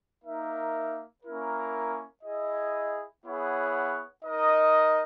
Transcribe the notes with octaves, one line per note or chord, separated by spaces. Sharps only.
A#3 D#4 A#4 E5
A#3 C#4 E4 A#4
E4 G#4 D#5
B3 E4 G#4 C#5 F#5
D#4 A#4 D#5